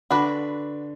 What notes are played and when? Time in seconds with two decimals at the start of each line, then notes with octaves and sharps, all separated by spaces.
0.11 D3 D4 F#4 B4